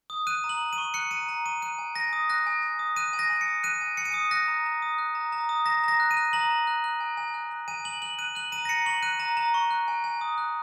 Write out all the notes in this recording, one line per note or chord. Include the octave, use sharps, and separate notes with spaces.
D#6
F#6 D#7
A#5
F#7
A#5
D#7
C#6
F#6 C#7
A#5 D#7
A#5
C#6 D#7
F#6 D#7
G#5
G#5 A#6
D#6
F#6 A#6
G#5
G#5
D#6
F#6 D#7
G#5
A#6
G#5
C#7
D#6
F#6 D#7
G#5
G#5 C#7
D#7
D#6 C#7
F#6 A#6
A#5
A#5
D#6
F#6
A#5
A#5
D#6
A#5 A#6
A#5 A#6
F#6
D#7
F#6
A#5 F#7
A#5
F#6
F#6
G#5
G#5
F#6
F#6
G#5 D#7
G#5 F#7
F#6 F#7
F#6 D#7
F#6 F#7
A#5 D#7
A#6
A#5 C#7
C#6 F#7
F#6 D#7
A#5
A#5
C#6
F#6
G#5
G#5
D#6
F#6